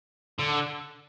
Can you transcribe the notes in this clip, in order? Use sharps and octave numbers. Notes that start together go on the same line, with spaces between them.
D3